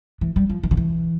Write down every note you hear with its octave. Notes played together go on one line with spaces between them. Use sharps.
E3
G3
F3
E3
D3
E3